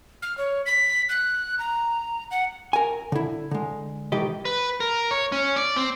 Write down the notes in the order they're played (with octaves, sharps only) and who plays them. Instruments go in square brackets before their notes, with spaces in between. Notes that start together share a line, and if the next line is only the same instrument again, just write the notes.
[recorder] F6
C#5
B6
F#6
A#5
F#5
[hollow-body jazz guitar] A#4 G#5
D3 E4
D3 G#3
B1 D#3 E3 G4 D#5
[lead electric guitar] B4
A#4
C#5
C#4
D5
C4